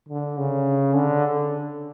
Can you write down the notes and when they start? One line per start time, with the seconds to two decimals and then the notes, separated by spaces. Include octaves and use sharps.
0.09 D3
0.38 C#3
0.95 D3